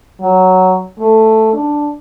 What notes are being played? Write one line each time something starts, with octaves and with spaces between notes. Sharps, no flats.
F#3
A3
D4